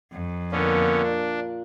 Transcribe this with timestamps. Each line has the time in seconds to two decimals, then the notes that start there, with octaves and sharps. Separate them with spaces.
0.12 F2
0.52 A#2 D3 B3 C#4
1.03 D4